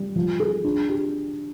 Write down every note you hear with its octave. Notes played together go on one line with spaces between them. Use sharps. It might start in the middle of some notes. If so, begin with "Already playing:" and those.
Already playing: G3
F3
G#4
D4
G4